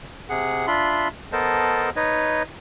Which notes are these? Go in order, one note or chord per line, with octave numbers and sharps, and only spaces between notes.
C3 G#4 F#5
D4 F4 E5 B5 C6
B3 A4 A#4 C5 D#5 A5
D#4 B4 C#5 D#5